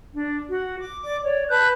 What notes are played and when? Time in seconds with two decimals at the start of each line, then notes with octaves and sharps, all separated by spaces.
0.15 D4
0.48 F#4
0.80 D6
1.03 D5 D6
1.24 C#5 D5
1.49 B4 A5 F#6 G6